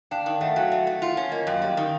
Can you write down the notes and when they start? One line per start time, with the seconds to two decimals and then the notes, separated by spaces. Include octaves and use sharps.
0.11 D4 F5 G5
0.26 D#3
0.41 A3 E5 F#5
0.56 F#3 F5 G5
0.71 A3 E5 F#5
0.87 A3
1.02 F4
1.17 C#4
1.32 A#3 D#5 F5
1.47 F#2 F5 G5
1.62 G3
1.77 D#3